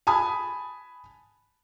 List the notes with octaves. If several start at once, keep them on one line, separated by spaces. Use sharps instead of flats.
G#5 A5 B5 D#6